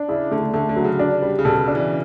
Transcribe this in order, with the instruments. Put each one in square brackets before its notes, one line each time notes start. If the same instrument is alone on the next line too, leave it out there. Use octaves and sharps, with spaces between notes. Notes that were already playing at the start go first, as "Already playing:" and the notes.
Already playing: [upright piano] D4
[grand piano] C#3 [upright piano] E4
[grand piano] D3 [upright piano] A3
[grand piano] D3 [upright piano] A3
[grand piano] D3
[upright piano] F#3
[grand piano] C#3
[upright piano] D4
G3
[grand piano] C#3
[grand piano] B2 [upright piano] A4
[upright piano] D4
[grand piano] E3